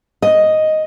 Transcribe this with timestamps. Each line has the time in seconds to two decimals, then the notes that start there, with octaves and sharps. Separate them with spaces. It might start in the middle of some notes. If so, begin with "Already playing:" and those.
0.22 D#5